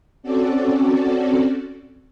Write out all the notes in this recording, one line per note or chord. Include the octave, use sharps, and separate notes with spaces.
C4 C#4 F#4 A4 D5